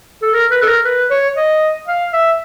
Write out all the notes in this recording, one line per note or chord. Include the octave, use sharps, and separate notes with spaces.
A4
A#4
B4
A4
A#4
B4
C#5
D#5
F5
E5